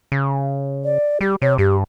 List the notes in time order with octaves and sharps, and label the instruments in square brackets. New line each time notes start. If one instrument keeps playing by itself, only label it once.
[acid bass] C#3
[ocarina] D5
[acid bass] G3 [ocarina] G4
[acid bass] C3 [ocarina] C#5
[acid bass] G2 [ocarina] G4